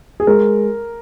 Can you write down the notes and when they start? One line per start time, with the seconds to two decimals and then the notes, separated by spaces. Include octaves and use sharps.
0.20 G#4
0.27 G#3 A#4